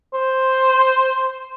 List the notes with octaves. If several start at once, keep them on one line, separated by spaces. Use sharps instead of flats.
C5